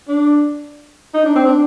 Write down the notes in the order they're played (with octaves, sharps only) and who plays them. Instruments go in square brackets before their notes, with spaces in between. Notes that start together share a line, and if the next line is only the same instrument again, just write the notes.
[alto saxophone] D4
D#4
D4
C4
D4